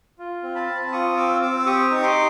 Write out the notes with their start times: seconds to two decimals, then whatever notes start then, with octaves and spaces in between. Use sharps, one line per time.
0.18 F4
0.43 C4
0.55 A5 B5
0.68 C4
0.92 F4 C#6 D#6
1.16 C4 D6 E6
1.41 C4 D6 E6
1.66 G4 C#6 D#6
1.91 D#4
2.02 C6 D6